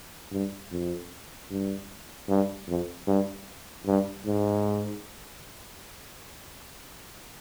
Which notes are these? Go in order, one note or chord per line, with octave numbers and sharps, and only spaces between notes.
G2
F2
G2
G2
F2
G2
G2
G#2